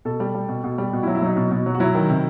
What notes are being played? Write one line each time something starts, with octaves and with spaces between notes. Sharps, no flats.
B2 A4
G3
G3
B2
B2
G3
B2 F#4
E4
F#3
E4
F#3 D#4
B2
B2
F#3
F#4
F#3 E4
D#3
C3